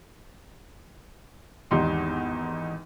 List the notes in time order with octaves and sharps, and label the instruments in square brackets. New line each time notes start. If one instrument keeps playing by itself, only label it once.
[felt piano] G#1 E2 D#4 G4 C6